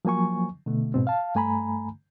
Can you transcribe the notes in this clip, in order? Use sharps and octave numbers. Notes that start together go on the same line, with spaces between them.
F3 F#3 A#3 G#5 C#6
B2 D3 A3
G#2 B2 C4
F5 A5
G2 A3 G#5 A#5 B5